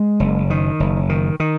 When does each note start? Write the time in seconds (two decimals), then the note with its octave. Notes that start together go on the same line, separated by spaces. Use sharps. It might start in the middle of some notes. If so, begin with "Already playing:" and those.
Already playing: G#3
0.20 F#1
0.50 D#3
0.80 F#1
1.09 D#3
1.40 D#3